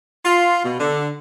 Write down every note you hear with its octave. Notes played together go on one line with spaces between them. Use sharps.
F4
B2
D3